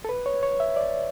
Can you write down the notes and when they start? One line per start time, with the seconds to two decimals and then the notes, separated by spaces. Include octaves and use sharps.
0.05 A4
0.09 B4
0.26 C#5
0.43 C#5
0.60 E5
0.76 D5